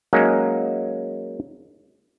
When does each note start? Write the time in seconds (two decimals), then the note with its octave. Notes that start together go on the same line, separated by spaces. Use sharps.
0.13 F#3 G#3 A#3 C#4 D#4